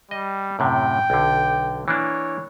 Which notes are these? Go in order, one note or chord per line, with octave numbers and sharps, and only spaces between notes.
G3 D#5
F#2 A2 C3 G5
B1 D3
E3 A#3 D4 C#5